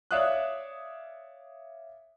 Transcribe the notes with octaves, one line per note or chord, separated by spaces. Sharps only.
C#5 D5 E5 F5 D#6 F#6